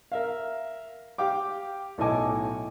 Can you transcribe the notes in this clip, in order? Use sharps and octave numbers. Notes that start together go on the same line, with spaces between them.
A#4 E5 F5
G4 F5 G5 D6
B1 A2 A4 D#5 G#5 D6